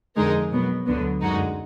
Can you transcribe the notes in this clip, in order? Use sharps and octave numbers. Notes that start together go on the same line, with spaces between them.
F2 D3 G#3 D#4 A#4
B2 F#3 B3
D2 D3 F#3 B3
F#2 D3 G#3 D#4 F#4